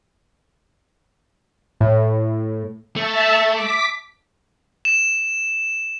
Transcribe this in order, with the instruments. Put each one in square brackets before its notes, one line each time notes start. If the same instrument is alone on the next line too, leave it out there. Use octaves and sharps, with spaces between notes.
[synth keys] A2
[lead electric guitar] A3 [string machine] E5 A5
[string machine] D6 B6
[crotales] E7